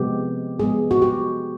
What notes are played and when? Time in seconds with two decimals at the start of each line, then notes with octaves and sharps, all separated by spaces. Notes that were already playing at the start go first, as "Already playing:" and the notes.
Already playing: C3 F3 G#3 B3 G4
0.59 C3 F3 G#3 B3 G#4
0.91 F#4
1.02 G4